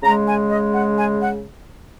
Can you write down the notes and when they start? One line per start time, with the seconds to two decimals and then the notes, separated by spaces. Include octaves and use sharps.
0.03 C#3 G#3 A#5
0.27 G#5
0.50 D#5
0.73 F#5
0.97 G#5
1.22 F#5